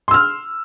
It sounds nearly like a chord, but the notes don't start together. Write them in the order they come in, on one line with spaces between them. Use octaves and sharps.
C6 E6 F6